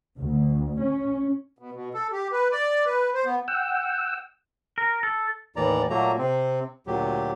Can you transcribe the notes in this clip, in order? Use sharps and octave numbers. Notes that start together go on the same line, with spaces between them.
D2
C#4
B2
B2
A4
G4
B4
D5
B4
C5
B3
F#5 G5 E6
A#4
A4
D#2 A2 E3 D5 A#5
A#2 F#3 A3 A#3 A#5
C3 C4
D2 A#2 F#3 G4